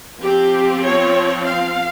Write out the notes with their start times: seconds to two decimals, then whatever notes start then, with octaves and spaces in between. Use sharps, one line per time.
0.21 F3 C4 G4
0.83 C#5
1.45 F5